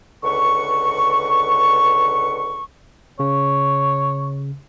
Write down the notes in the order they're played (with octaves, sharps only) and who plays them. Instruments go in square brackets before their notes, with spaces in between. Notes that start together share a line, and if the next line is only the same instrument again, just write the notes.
[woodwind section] C#2 D3 B4 C#6
[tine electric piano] C#3 [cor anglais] C#5